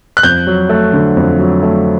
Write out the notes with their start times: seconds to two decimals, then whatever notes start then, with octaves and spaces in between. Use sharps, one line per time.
0.17 F#6
0.23 F2 G6
0.47 F#3
0.69 A3
0.93 D3
1.17 F2
1.39 F#3
1.63 A3